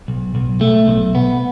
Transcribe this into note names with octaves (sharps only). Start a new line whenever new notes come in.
B1
B1
A3
B1
B3